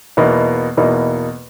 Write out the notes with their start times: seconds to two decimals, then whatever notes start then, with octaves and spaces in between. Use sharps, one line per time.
0.17 E2 B2 A#3 D#4
0.77 E2 B2 A#3 D#4